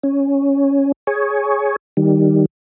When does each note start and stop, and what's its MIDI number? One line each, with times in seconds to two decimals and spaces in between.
0.03 0.92 61
1.07 1.76 68
1.07 1.76 73
1.97 2.46 51
1.97 2.46 55